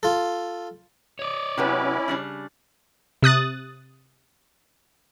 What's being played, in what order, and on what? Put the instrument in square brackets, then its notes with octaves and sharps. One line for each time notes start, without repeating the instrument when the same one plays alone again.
[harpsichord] F4 A4
[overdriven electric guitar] C#5 D5
[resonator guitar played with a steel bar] C3 F#3 B3 [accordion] C#4 E4
[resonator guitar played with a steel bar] C#3 G3 D4
[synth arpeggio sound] C3 D#6 F#6 A6